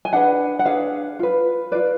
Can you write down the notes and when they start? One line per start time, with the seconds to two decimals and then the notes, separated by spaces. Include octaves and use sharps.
0.05 G#5
0.13 D4 G#4 B4 F#5
0.59 F#5
0.65 D4 G#4 B4 F5
1.19 F4 B4
1.72 F4 B4 D5